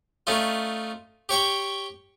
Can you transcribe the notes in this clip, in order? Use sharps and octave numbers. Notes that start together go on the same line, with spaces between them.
A3 C#4 D#4 F4
G4 C#5 G5 C#6